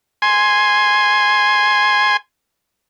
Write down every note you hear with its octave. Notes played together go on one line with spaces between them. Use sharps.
G#5 C6